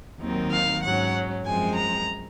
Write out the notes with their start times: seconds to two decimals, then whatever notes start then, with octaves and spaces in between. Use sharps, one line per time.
0.21 D#2 D#3 F#3 C4 D#4
0.52 F5
0.82 G#2 F#3 C#4 F#5
1.44 F#2 F3 G#3 C4 G#5
1.75 A#5